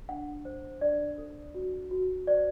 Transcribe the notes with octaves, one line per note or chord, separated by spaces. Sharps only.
D4 F#5
C5
D4 D5
A4
F#4
F#4
C5 D5